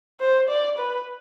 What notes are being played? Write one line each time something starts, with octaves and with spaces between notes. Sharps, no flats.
C5
D5
B4